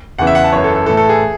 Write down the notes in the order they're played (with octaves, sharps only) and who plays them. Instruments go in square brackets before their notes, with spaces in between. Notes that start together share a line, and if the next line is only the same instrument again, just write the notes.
[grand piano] E2 C#3 E3 F#5
E5
F#5
A5
F#2 E3 C#5
A4
A4
E3 A4
A2
A4
G#4